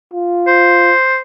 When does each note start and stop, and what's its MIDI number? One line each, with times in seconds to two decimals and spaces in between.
0.14 0.93 65
0.47 1.20 72